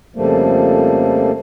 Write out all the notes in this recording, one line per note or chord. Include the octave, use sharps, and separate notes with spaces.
F2 C#3 F3 G3 A3 A#3